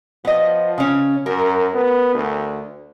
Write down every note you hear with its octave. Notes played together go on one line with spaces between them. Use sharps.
F3 B3 D#5
C#3 C#4
F#2 A#4
B3
D2